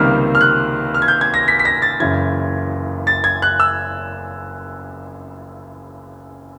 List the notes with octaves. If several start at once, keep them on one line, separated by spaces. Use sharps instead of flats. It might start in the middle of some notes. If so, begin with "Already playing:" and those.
Already playing: C#2 C3 D#3 G3 A#3 F6
F6
F#6
F6
G#6
G6
G#6
A#6
B6
B6
A#6
A6
F#1 F#2 C#3 E3 G#6
A6
G#6
F#6
E6